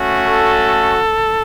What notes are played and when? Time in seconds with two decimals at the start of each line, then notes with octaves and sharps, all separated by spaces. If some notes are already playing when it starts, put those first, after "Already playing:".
Already playing: A3 C#4 F#4
0.24 A4